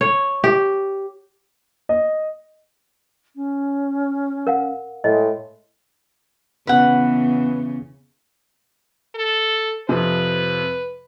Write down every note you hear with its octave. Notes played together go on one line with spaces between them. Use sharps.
C#5
G4
D#5
C#4
A#4 F5 F#5
A2 G#3 D#5
E2 C#3 B4 F#5
A4
F2 C3 F3 B4